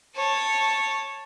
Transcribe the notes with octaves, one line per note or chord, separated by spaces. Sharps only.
C#5 A5